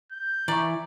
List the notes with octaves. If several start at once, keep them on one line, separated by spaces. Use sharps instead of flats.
G6
E3 E4 D5 A#5 C#6